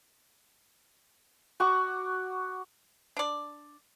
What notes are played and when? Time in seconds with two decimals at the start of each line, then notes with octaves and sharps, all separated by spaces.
1.60 F#4 F#5 C#6 D6
3.17 D4 D5